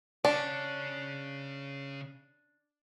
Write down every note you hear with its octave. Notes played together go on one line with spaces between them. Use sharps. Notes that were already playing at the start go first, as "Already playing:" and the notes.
C#3 C#4 D4